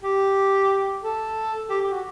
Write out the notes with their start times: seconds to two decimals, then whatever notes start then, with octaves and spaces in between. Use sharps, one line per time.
0.03 G4
1.02 A4
1.69 G4
1.81 G4
1.91 F#4